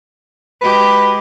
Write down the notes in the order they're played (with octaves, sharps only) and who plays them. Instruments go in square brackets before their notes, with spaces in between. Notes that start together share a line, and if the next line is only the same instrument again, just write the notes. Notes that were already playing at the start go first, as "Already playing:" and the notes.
[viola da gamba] G#3 F#4 G4 [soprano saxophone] B4